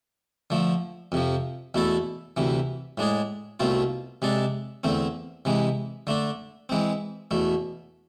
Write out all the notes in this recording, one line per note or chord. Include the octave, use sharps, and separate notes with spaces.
D3 F3 A3
F2 C3 F3
E2 B2 A3 E4 A4
D2 C3 E3
A2 G#3 D4 G#4
C2 B2 A3 C4 F4
C3 G#3 D4 A4
E2 D3 A3 C4
C3 E3 G#3
D3 A3 D4
E3 G#3 C4
E2 B2 A3